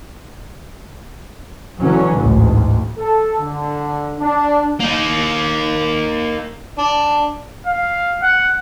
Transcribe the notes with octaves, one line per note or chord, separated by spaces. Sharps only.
D3 E3 F#3 C#4
A1 D2 G#2
A4
D3
D4
A#3 D#4
D4
F5
F#5